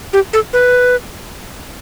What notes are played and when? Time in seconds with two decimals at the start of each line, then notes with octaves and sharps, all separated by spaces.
0.13 G4
0.33 A4
0.53 B4